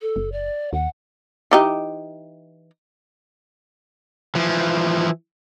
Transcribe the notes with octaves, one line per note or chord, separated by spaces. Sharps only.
A4
F#1
D5
D#2 F#5
E3 D#4 G4
E3 F3